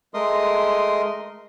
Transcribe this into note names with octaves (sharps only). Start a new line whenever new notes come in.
G#3 A3 A#4 D#5 C6 D#6